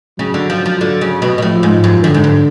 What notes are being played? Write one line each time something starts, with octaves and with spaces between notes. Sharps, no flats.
C#3 F#3
D3
F3
F3
D3
C#3
B2
B2
A2 F3
G#2
F#2
F#2 D3
G#2
F#2